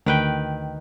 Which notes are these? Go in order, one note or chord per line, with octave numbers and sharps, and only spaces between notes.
D2 D#3 B4 G5